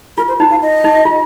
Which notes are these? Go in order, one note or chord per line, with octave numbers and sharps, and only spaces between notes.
F4 A#4
C5
D#4 F4
F5
D#5
D#4
F4